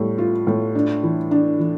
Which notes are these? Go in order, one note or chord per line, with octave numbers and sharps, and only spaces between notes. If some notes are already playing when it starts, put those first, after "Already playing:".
Already playing: A2 G3
F4
A2
D4
E3
D4
E3